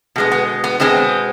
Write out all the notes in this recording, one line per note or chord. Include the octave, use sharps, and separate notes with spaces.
B2 G#3 B3
B3
B3
B2 G#3 B3 C4